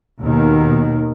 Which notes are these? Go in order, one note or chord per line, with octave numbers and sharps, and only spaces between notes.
D#2 B2 D#3